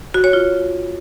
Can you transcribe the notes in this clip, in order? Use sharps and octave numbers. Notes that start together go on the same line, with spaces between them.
F#4
C#5
F4